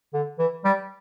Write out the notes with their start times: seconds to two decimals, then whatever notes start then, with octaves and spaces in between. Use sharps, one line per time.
0.14 D3
0.39 E3
0.65 G3